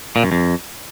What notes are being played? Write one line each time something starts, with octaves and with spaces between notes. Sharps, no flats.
A#2
F#2
F2